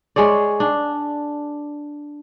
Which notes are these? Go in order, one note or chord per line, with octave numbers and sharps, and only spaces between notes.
G#3 G#4 C#5 D5
D4